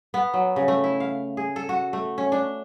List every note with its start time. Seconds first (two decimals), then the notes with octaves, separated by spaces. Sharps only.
0.14 B3
0.34 F#3
0.56 C#3
0.68 A3
0.84 E4
1.00 F5
1.37 G#4
1.56 A4
1.69 F#4
1.93 A3
2.18 C#4
2.32 D4